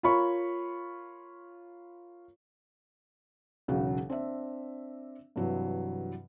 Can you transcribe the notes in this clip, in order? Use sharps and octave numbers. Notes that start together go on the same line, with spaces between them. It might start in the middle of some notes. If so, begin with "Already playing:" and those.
F4 A#4 C#5 B5 C#6
E1 B1 C#3 F#3 F#4
C4 D4 E5
G2 C3 E3 F#3